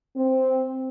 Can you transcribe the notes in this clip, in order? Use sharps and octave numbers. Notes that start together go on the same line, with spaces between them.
C4